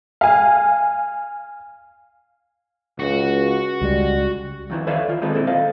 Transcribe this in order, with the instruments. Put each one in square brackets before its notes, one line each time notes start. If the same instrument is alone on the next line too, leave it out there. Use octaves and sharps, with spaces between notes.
[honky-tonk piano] F5 G#5
[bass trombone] C#2 [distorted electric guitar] F#4
[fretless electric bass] C#2 G#3 [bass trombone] G3
[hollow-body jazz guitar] F2 D#3 E3
A4 B4 C#5 D5 E5 F5
D#3 F4
G#3 C4 D#4 G#4 A4 B4
D2 A#2 C4 E4
A4 D#5 F5